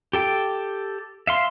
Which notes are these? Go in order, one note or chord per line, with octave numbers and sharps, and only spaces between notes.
G4 A4 G5
E5 F5 C6